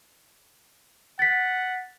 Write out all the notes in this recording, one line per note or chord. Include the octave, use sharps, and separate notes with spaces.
F#5 A6 B6